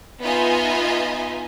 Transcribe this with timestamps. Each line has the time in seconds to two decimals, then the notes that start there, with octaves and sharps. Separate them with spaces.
0.22 B3 D#4 F4 D#5 E5 G#5